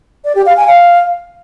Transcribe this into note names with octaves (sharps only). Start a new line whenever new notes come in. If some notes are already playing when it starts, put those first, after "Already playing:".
D5
G4
F5
G#5
F5